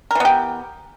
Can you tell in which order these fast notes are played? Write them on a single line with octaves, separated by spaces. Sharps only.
A#4 E3 B3 G4